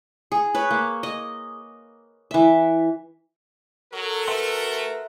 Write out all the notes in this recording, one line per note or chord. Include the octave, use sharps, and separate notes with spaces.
G#4
B4 C#5
A#3
D#5
E3 E5
F#3 F#4 A4 A#4
A3 B4 E5 F#5 C6